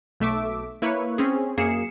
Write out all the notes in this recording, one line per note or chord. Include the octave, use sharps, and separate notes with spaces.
B1 A3 E5 D6
A#3 E4 B4 C#5
C4 C#4 G#4
F#2 A#3 G#4 C7 C#7 E7